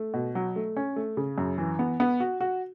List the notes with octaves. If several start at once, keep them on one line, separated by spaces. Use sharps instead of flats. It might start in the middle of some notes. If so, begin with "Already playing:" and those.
Already playing: A3
B2
F#3
A3
C#4
A3
C#3
F#2
E3
B3
B3
F#4
F#4